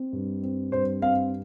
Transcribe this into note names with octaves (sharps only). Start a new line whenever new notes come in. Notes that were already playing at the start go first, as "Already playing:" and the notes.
Already playing: C4
G2
C4
G2 C5
C4 F5